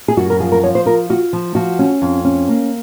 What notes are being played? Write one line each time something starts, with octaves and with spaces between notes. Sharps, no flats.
G#4
F#2 F#4
A#4
F3 G#4
A#4
F3 C#5
C5
F4 A#4
F4 F#4
F3
F3 F#4
C#4
F2
C#4
A#3